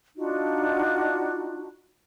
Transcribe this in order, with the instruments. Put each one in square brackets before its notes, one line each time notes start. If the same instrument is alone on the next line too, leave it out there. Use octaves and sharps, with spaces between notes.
[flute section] D4 D#4 F4 F#4